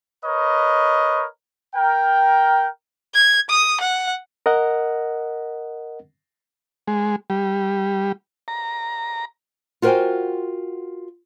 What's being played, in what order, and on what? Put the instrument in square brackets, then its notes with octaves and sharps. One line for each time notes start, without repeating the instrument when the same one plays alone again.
[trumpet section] A#4 B4 C#5 D#5
A#4 G5
[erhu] G#6
D#6
F#5
[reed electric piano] A#4 D#5 F#5
[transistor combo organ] G#3
G3
A#5
[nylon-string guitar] F4 F#4 A#4 C5 G5 G#5